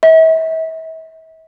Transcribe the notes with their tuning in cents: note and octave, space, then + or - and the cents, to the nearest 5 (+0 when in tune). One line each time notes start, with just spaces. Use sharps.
E5 -40